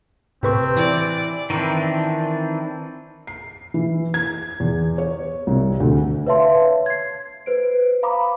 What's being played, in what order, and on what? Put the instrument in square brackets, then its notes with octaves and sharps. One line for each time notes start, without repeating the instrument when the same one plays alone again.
[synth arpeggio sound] A2 B4 C#6 [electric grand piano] C3 [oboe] C4
[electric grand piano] E3 [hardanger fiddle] D5
[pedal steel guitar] D#3 E3 C4 D4
[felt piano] C7
E3
G#6
E2
C#5
C2
D2
[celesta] B4 C#5 E5 F5 A5 C6
G#6 C7
B4 C5 D7
F5 A#5 B5 D6 D#6